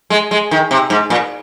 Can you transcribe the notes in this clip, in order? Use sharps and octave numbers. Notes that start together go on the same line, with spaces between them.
G#3
G#3
D#3
C3
G#2
A#2